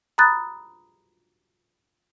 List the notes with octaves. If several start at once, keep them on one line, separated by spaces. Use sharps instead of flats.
A#5 B5 D#6 F#6 A6